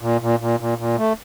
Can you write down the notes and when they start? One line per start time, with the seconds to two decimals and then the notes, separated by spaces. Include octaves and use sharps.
0.01 A#2
0.21 A#2
0.40 A#2
0.60 A#2
0.78 A#2
0.98 A3